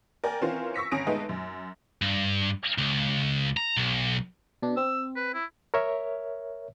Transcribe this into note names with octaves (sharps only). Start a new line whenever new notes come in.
A#4 D5 G5 G#5
E3 C4 C#4 F4 A#4 F5
C#6 E6 A#6 B6 C#7
G1 C#4 D#6 A#6 D7
G#3 A3 B3 D#4
F#2
G2
C#2
A#5
B1
B2 D4
C4 E6
B4
E4
A#4 C#5 E5